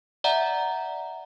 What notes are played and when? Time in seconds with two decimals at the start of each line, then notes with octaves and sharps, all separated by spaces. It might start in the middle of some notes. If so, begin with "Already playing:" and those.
0.24 D5 E5 F#5 A#5